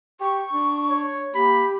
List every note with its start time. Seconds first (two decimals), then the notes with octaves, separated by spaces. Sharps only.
0.21 G4 C#6
0.53 D4
0.90 C#5
1.35 A#3 G4 B5